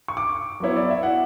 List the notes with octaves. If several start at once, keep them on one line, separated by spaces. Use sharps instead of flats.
C#6
D6
F#3 B3 E4 C#5
D5
E5
F#5